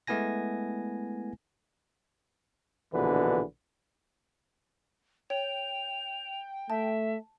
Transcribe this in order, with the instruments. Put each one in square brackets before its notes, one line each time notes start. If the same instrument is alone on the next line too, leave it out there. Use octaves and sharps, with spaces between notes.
[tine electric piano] G#3 A3 B3 E4 G#5 A#6
[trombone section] A#1 B2 D3 E3 B4
[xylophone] C#5 [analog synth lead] G5 [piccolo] F7
[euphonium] A3 [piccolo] E5 [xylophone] A5